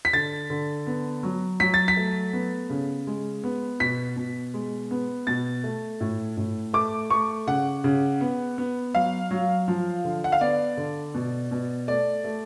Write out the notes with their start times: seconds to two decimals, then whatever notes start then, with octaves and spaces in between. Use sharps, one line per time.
0.05 B6
0.13 D3 A6
0.50 D3
0.87 B3
1.23 F#3
1.60 F#3 B6
1.74 A6
1.88 B6
1.97 A3
2.33 B3
2.70 C#3
3.07 G#3
3.44 B3
3.80 B2 B6
4.17 B2
4.54 G#3
4.91 B3
5.27 B2 A6
5.64 A3
6.00 A2
6.37 A2
6.73 A3 D6
7.10 A3 C#6
7.47 C#3 F#5
7.84 C#3
8.21 B3
8.58 B3
8.94 F#3 F5
9.31 F#3
9.68 F3
10.04 D3
10.24 F#5
10.32 F5
10.41 B3 D5
10.77 D3
11.14 B2
11.51 B2
11.88 A3 D5
12.24 A3